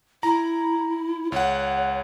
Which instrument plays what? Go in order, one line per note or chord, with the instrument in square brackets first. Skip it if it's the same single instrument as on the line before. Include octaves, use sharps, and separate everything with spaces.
[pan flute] E4 [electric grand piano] A#5
[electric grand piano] C#2 F#5 [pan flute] C#5